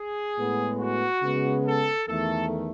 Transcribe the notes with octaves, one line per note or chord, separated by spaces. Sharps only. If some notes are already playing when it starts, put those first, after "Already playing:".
Already playing: G#4
A2 G#3 B3
F#4
C#3 G#3 B3
A4
E2 D#3 A3 A4